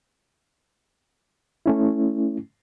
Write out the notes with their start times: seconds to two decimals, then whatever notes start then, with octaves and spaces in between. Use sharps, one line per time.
1.66 A3 C#4 E4